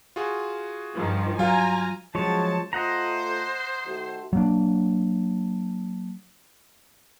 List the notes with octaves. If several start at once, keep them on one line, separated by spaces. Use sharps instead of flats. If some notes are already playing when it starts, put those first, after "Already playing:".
F4 F#4 G#4
G2 D#3 F3
F#3 F4 F5 G#5 A#5
C#3 F3 F#3 G#3 C#5 A5
A3 F4 C5 D#5 F#5 A#5
D#3 A3 F#4
F#3 A#3 D4